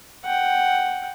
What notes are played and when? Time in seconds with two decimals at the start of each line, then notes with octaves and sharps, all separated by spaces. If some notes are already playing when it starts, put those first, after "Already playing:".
0.25 F#5 G5